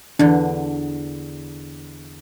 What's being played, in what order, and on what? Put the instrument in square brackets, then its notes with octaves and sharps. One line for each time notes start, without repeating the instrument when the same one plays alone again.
[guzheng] E2 D3 [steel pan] D4